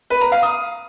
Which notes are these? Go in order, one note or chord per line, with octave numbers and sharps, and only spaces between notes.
B4
A#5
F5
D#6